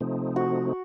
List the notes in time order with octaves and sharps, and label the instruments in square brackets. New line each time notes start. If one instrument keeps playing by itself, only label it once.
[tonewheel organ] C3 F3 A3 C4 D#4
[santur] F#4